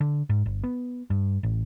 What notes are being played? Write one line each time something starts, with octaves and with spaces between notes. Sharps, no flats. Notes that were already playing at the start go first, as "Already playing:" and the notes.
D3
G#2
G1
B3
G2
A1